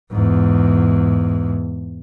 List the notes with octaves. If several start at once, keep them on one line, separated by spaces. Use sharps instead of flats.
E2 G#2